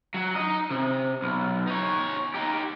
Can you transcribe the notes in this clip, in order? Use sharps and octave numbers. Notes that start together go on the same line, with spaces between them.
F#3
D#4 D#5
C3
B1
D#4 C#5
D#4 G4